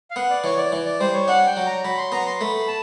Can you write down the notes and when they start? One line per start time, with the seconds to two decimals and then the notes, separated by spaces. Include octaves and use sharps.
0.11 F5
0.16 B3 F#5
0.30 D5
0.44 E3 C#5
0.58 D5
0.72 E3
0.86 D5
1.00 G3 C5
1.14 C#5
1.28 D4 F#5
1.47 G5
1.57 F#3
1.66 A#5
1.84 F#3 B5
1.98 C6
2.12 B3 A#5
2.26 C6
2.40 A3 B5
2.68 A5